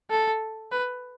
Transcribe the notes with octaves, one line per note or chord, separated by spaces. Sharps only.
A4
B4